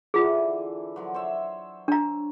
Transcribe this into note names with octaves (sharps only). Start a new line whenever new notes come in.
D3 E3 F4 G#4
D3 F3 F#3
C5 C#5 E5
D4 A#5